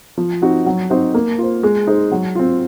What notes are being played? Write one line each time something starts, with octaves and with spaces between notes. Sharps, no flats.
F3
C4 D#4 F#4
F#3
C4 D#4 F#4 C5
A#3
F4 C5
G#3
D#4 G#4 C5
F#3
C4 F4